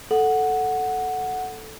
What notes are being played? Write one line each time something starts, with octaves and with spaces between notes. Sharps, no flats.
A4 F#5